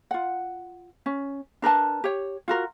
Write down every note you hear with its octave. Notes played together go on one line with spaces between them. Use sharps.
F4 F#5
C#4
D4 A#4 B4 A5
G4 C#5
F4 F#4 A#4